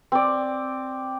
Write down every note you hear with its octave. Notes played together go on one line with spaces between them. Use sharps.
C4 D5